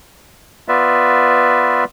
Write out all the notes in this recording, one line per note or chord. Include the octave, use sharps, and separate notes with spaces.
B3 F4 B4 D5 E5